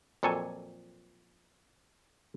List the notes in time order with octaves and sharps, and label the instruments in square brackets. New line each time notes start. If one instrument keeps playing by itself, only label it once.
[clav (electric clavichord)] F2 A#2 F#3 A4 C#5 G#5